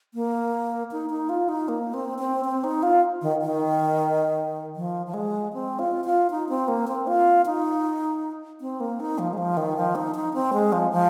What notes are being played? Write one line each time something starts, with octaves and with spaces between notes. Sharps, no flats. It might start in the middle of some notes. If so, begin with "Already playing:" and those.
A#3
D#4
D#4
F4
D#4
A#3
C4
C4
C4
D#4
F4
D#3
D#3
F3
F3
G#3
C4
F4
F4
D#4
C4
A#3
C4
F4
D#4
C4
A#3
D#4
F3
G#3
F3
D#3
F3
D#4
D#4
C4
G#3
F3
F3